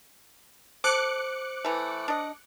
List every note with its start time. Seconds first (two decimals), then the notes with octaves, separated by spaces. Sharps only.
0.84 A4 C5 D6 F#6 C#7
1.65 E3 A3
2.08 D4 D#5